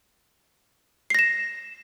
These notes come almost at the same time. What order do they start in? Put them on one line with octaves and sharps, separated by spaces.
C7 A#6 E7